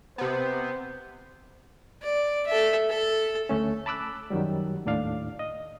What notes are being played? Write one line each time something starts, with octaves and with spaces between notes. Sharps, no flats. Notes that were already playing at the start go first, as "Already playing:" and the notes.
C3 B3 C5
D5
A4 E5
A4
D2 A3 C#4
A5 B5 D6 E6 F#6
F#2 D#3 F#3 G3
D#2 A2 D4 D5 F5
D#5